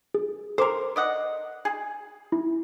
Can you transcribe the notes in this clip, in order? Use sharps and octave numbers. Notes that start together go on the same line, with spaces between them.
G#4
A4 A#4 C5 C6 D6
D5 D#5 F#5
G#4
E4